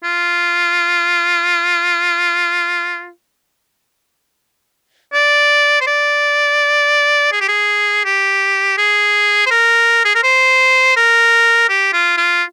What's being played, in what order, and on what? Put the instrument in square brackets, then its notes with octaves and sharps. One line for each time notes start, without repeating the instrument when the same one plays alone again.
[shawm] F4
D5
C5
D5
G#4
G4
G#4
G4
G#4
C5
A#4
G#4
A#4
C5
A#4
G4
F4
F4